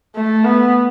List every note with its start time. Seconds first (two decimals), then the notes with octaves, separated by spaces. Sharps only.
0.15 A3
0.44 B3